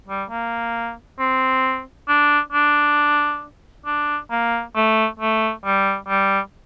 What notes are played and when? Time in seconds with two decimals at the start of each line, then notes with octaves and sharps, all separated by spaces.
0.08 G3
0.30 A#3
1.19 C4
2.09 D4
2.52 D4
3.86 D4
4.31 A#3
4.76 A3
5.19 A3
5.65 G3
6.08 G3